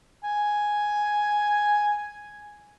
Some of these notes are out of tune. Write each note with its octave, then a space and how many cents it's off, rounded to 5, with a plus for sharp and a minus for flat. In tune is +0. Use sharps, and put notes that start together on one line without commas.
G#5 +0